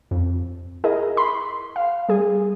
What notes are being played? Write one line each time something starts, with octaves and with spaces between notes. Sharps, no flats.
F2
E4 G#4 A#4 D#5
B5 C6
F5
G3 G#4